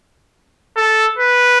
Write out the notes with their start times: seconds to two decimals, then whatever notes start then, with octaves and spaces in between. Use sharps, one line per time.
0.76 A4
1.18 B4